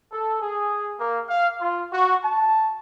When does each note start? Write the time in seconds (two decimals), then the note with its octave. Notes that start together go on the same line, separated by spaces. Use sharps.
0.12 A4
0.42 G#4
1.00 A#3
1.29 F5
1.61 F4
1.93 F#4
2.22 A5